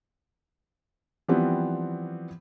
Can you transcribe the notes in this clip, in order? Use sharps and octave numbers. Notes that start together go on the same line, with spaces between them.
E3 F3 G3 B3 C4